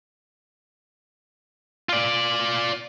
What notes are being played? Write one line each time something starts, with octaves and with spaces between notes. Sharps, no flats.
F4 D5